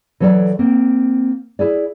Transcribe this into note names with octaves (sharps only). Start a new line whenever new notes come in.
E3 F#3 A4 C#5 D5
A#3 C4
E4 G#4 D5